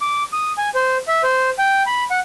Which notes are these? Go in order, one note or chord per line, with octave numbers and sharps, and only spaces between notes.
D6
D#6
G#5
C5
E5
C5
G5
B5
F#5